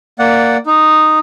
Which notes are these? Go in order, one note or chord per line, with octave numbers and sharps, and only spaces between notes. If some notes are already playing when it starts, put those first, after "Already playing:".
A#3 D5 F#5
D#4